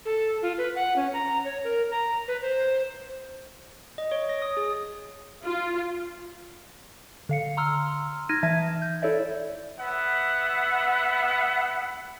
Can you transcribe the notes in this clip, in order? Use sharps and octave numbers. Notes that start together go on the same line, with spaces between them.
A4
F4
B4
F#5
C#4
A#5
C#5
A#4
A#5
B4
C5
D#5
C#5
A#6
D#6
G#4
F4
D3 F5 C#7
A#5 C6 E6 F6
D#4 F6 G#6 A#6 D#7
E3 E5 A5 G#6
G6
E4 A4 C#5 D5 E5
B3 E5 F#5